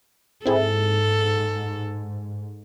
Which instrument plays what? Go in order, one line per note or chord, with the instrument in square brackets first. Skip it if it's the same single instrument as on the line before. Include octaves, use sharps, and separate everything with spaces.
[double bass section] G#2 [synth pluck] C4 E4 G#4 [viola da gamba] A4